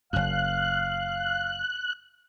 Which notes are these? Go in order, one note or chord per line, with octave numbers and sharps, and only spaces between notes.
F#1 F#2 F5 F#6